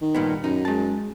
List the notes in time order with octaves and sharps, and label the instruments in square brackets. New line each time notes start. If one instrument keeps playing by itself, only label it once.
[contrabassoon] D#3
[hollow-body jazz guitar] G2 A#2 B3
[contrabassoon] F#2 [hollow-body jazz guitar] D#4
[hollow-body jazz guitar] G#3 A5